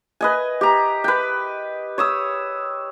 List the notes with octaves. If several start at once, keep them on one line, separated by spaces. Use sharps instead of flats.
B4 D#5 G#5
G4 A#5
B4 G5
C#5 D#6 E6